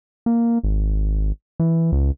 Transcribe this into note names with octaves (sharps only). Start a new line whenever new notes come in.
A#3
G#1
E3
C#2